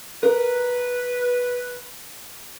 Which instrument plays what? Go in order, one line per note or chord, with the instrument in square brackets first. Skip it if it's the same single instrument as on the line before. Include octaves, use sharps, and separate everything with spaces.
[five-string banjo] A#4 [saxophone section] B4